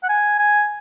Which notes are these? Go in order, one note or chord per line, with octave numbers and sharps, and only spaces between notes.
F#5
G#5
G#5